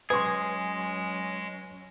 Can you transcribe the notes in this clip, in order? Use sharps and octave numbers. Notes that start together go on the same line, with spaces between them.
F#3 G#3 C#4 G#4 B4 C6